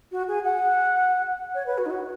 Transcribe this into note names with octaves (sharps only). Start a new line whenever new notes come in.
F#4
G#4
F#5
C#5
B4
F#4
D#4
F#4